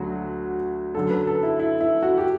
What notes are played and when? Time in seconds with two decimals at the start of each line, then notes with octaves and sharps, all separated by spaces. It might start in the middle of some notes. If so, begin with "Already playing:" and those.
Already playing: D2 D3 F#3 F#4
0.94 F#2 D3 F#3 A4
1.10 B4
1.27 A4
1.43 E4
1.59 E4
1.81 E4
2.03 F#4
2.18 G4